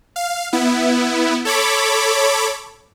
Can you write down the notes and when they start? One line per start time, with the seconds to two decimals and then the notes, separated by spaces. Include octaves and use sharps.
0.16 F5
0.53 B3 E4
1.45 A4 C#5 B5 D6